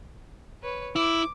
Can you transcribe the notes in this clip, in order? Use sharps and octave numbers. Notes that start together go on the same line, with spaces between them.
B4 C#5
E4 D6